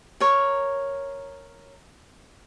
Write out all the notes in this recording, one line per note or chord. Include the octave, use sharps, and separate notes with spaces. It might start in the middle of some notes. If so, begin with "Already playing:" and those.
A#4 C#5